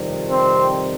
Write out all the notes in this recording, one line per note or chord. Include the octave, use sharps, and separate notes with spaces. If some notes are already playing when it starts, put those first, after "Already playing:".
Already playing: F2 C3 D#3 G3
C4